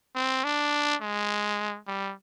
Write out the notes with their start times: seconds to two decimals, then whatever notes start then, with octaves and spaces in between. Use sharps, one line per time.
0.15 C4
0.44 D4
1.01 G#3
1.87 G3